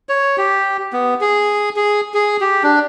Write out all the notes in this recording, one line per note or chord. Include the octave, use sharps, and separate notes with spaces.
C#5
G4
B3
G#4
G#4
G#4
G4
D4